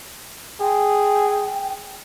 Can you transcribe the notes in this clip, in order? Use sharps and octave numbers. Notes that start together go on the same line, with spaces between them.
G#4 G5